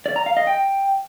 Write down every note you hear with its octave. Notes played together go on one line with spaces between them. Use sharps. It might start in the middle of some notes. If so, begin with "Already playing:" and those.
D5
A#5
F5
D#5
G5